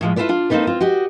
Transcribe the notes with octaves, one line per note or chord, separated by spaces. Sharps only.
A2 F3 G#3
E4 F4 G4 A4 B4 D5
D4 F4
A#3 C4 C#4 D#4 A4 B4
C4 F4
F#4 G4 D#5